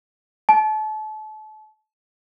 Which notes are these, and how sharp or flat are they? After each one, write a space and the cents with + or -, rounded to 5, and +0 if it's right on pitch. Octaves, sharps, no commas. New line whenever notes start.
A5 -35